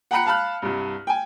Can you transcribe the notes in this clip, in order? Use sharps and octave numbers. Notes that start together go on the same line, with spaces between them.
F#5 G5 A#5 B5 F#6 C#7
F5 A5 B5 F6 F#6
C2 G2
G5 G#5